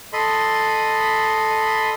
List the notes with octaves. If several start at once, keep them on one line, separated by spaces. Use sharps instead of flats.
A4 D#5 B5 C6